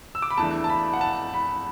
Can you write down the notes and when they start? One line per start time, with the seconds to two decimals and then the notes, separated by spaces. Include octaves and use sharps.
0.15 E6
0.22 D6
0.30 B5
0.38 E2 E3 A3 D4 A5
0.64 A5
0.69 B5
0.94 F#5
1.01 A5
1.34 B5